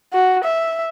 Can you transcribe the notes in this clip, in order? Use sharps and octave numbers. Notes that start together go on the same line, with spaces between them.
F#4
E5